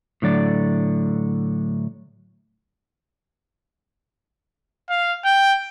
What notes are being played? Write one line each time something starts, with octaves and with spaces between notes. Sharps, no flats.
A2 D3 F#3 D5
F5
G5